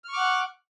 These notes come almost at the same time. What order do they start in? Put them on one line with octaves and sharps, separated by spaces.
F6 C#6 D6 F#5